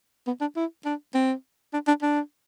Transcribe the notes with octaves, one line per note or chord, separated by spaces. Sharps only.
B3
D4
E4
D4
C4
D4
D4
D4